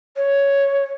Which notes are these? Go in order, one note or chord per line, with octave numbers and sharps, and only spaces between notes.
C#5